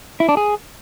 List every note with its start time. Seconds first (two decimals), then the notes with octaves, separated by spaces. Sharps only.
0.20 E4
0.29 D4
0.37 G#4